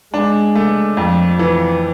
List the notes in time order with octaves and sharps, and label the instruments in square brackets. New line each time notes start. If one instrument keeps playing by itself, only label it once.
[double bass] G#3 [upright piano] D4
[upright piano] A3
[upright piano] F2 [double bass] F3
[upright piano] E3